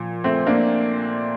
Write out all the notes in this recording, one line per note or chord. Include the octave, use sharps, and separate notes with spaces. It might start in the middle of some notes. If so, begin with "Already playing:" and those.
Already playing: A#2 F3
A3 C4
A#3 D4